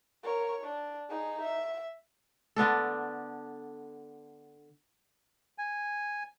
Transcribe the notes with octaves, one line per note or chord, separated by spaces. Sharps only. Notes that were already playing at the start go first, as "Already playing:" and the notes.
A#4 C#5
D4
D#4 G#4
E5
D3 B3 D4 A4
G#5